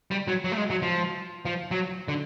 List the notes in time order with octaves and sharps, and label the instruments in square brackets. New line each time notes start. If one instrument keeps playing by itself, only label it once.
[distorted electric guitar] G3
F#3
F#3
A3
G#3
F#3
F3
F3
F#3
D3